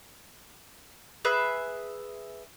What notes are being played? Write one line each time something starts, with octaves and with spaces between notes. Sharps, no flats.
G#4 B4 E5 F#6